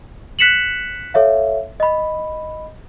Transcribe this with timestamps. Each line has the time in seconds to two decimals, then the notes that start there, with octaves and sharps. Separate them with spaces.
0.39 F#6 B6 C#7 E7 F#7
1.14 A4 C#5 E5 F5
1.80 D#5 B5